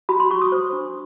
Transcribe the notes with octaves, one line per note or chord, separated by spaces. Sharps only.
F#4 B5
C6
F#4 C#6
D#6
C5
D4